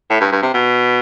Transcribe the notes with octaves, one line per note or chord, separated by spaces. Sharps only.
A2
G2
G2
C3
B2